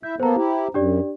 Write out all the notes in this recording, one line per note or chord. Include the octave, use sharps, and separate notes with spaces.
E4 E5 G6
A#3 B3 A4 C5 A#5
E4 G4
F#2 D4 G4 D5